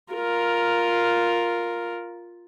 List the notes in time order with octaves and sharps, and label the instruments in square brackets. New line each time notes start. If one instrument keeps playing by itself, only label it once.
[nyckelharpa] F4 A#4